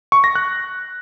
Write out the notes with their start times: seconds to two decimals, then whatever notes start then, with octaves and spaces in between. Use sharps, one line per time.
0.12 C#6
0.24 A#6
0.35 F#6